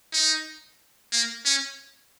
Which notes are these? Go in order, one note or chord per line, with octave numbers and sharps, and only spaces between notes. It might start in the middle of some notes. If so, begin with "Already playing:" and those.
D#4
A#3
C#4